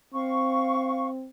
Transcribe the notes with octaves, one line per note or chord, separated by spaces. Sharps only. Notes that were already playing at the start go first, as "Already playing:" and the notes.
C4 F5 C#6